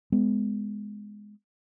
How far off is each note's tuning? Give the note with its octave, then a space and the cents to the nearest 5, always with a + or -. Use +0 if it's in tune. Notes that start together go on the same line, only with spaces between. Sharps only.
G#3 +0 B3 +20